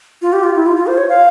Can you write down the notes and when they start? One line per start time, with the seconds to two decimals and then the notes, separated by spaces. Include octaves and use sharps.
0.22 F4
0.33 G4
0.43 F4
0.55 E4
0.66 F4
0.76 F4
0.87 C5
0.98 C#5
1.09 F5